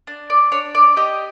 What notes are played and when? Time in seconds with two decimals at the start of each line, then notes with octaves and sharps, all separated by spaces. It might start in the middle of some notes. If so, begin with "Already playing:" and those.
0.07 D4
0.30 D5
0.52 D4 C#5
0.75 D5
0.97 G4 D#5